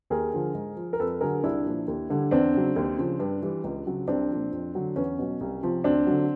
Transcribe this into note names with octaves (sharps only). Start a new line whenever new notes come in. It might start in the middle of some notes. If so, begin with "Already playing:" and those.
D#2 G#4 A#4
D3 F3
G#2
F3
A#4
F2 A4 B4
D3 F#3 G#4 A#4
C2 D4 E4
A#2 F3
D#2
D3 G3
E2 C4 D4
C#3 F#3
D#2
C#3 F3
G2
E3 G3
C#2
C#3 F#3
C2 C4 D4
A#2 F3
F2
D3 F#3
E2 C#4
B2 F#3
C2
C3 F3
D2 C4 D4
D3 F#3